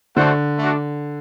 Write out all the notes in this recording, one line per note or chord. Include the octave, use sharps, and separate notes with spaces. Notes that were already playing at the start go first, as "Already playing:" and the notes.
D3 A3 D4 F#4 C5 F#5
A3 D4 F#4